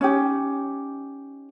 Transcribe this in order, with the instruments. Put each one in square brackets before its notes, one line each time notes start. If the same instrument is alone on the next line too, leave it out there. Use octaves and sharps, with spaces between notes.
[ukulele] C#4 D#4 G4